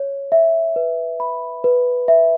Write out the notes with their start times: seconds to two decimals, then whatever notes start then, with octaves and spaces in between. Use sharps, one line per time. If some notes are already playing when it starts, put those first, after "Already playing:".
Already playing: C#5
0.32 E5
0.76 B4
1.20 B5
1.64 B4
2.08 E5